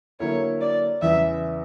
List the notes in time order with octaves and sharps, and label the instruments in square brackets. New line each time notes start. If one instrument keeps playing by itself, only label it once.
[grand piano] D3 F#3 A#3 E4 A#4 [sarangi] C#5
[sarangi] D5
[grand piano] E2 C#3 E3 G3 [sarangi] E5